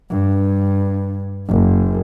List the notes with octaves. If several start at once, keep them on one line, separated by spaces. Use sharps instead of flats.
G2
F#1